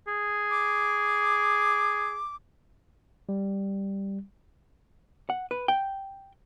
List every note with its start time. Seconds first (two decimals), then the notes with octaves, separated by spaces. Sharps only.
0.08 G#4
0.50 D6
3.29 G3
5.30 F#5
5.51 B4
5.68 G5